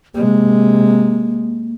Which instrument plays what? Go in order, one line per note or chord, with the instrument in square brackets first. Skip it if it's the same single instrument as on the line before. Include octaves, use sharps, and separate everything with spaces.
[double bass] C3 G#3 [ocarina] A#3